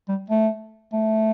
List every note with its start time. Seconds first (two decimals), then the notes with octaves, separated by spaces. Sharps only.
0.08 G3
0.30 A3
0.93 A3